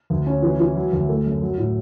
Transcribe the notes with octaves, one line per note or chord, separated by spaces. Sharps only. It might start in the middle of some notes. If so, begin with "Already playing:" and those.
D2
C#4
E3
E3
F#3
D2
A3
F#2
F#3
A2